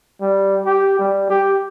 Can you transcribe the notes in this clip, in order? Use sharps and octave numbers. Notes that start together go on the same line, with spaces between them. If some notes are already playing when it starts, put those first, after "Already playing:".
G3
G4
G3
G4